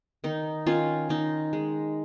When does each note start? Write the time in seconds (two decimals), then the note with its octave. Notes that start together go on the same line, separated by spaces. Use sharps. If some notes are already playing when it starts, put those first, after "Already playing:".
0.24 D#3 D#4
0.66 D#3 C#4 F4
1.09 D#3 D#4
1.53 G#3